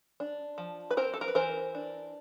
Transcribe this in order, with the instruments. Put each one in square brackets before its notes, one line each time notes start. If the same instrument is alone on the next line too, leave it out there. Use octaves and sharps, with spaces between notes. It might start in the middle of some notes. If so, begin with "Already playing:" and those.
[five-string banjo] D4
F3
B4
C4 A#4 C5
A4
A#4
B4
E3 A#4 C5
D4